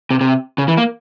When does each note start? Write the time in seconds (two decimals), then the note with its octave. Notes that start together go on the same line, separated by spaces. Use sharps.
0.11 C3
0.21 C3
0.58 C#3
0.68 E3
0.77 A#3